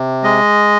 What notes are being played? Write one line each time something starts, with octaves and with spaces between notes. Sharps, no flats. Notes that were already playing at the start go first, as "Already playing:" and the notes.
Already playing: C3
G#3 D#5